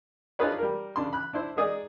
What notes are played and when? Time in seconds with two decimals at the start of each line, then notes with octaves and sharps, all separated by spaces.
0.39 D4 D#4 F4 G#4 B4 C#5
0.59 G3 A#4
0.96 C#3 D4 C6
1.13 B5 F#6
1.33 D4 E4 C5
1.56 G#3 D#4 G#4 D5 D#6